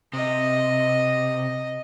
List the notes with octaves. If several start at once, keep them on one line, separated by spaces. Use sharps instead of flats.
C3 D#5